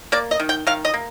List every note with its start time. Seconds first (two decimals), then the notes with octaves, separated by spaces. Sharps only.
0.12 A#3 D5
0.31 D#5
0.40 D#3
0.49 G5
0.67 D#3 F5
0.85 D#5
0.94 A#3